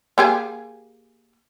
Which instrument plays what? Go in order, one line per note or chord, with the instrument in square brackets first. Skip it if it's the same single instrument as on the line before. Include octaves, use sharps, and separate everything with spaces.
[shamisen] A#3 G4 G#4